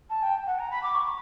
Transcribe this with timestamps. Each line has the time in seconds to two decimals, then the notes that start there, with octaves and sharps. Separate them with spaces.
0.10 A5
0.22 G5
0.47 F#5
0.59 A#5
0.71 B5
0.83 D6
0.94 C#6